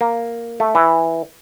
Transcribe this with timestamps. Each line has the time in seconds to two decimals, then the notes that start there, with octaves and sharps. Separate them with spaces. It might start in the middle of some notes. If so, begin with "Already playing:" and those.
0.01 A#3
0.60 A3
0.75 E3